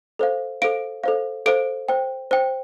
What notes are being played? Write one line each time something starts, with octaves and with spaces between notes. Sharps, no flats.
A4 C5 F5
A4 C5 F5 D7
A4 C5 F5
A4 C5 F5 D7
C5 G5
C5 G5